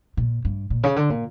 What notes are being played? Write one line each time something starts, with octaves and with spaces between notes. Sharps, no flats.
A#2
G2
A#2
C#3
D3
A#2